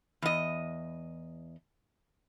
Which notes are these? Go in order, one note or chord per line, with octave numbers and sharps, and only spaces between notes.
E2 D#5